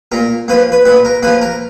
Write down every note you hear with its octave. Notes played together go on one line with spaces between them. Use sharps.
A#2 A#4
F3 A#3 B4
B4
A#2 B4
A#4
F3 A#3 B4
A#4